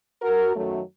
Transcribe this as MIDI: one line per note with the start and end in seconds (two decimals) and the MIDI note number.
0.22 0.52 66
0.22 0.52 70
0.55 0.80 42
0.55 0.80 51
0.55 0.80 54
0.55 0.80 57